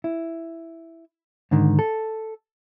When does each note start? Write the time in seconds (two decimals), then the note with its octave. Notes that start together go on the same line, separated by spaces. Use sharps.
0.04 E4
1.51 G#2 D3 D#3
1.79 A4